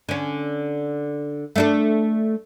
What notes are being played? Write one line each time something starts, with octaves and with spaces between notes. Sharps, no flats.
D3 C#4
A3 D4 A4